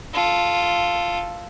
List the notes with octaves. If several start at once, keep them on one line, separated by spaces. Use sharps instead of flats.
F4 A4